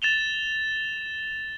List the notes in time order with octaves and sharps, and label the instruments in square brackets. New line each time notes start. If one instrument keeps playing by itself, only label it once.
[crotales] A6 E7 F7 G7